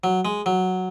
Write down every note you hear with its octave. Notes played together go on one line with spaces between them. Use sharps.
F#3
G#3
F#3